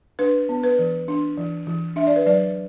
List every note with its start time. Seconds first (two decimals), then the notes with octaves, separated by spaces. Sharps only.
0.19 D4 B4
0.49 B3
0.63 B4
0.79 E3
1.08 D4
1.37 E3
1.67 E3
1.96 D4 E5
2.07 D5
2.16 B4
2.26 F#3 D5